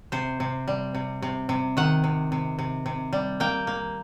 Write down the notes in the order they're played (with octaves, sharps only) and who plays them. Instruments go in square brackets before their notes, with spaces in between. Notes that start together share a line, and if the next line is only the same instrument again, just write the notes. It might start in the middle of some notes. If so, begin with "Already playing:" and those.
[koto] C3 C5
C3
G3
C3
C3
C3
D#3 F#5
C3
C3
C3
C3
G3
A#3 G5
A#3